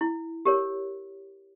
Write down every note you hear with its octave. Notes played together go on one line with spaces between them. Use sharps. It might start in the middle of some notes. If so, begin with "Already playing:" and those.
E4
G4 A#4 C#5